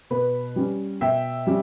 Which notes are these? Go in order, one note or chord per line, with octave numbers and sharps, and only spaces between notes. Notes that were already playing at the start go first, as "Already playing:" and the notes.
B2 B4
G3 C#4
B2 E5 G5
G3 C#4